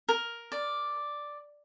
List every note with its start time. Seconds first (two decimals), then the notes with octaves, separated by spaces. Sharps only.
0.09 A#4
0.52 D5